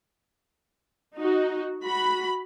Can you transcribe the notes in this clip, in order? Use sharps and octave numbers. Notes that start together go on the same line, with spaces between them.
D#4 F#4
F#4 B5